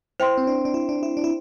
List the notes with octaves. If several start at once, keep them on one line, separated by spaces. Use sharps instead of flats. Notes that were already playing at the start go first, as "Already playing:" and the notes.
E4 C5 G5 C6
C4
D4
D4
E4
D4
E4
D4
E4